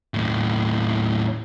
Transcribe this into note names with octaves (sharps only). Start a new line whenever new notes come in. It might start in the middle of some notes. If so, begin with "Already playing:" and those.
D#2 A2